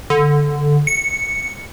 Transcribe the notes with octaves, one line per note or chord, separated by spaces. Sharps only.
D3
C#7